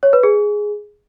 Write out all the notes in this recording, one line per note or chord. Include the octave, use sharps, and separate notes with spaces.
C#5
B4
G#4